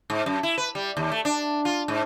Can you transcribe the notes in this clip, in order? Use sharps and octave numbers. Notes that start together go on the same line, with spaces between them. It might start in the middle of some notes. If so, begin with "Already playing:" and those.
G#2
F#2
E4
B4
G3
D#2
A3
D4
F4
G#2